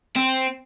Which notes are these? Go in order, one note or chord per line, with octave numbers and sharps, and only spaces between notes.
C4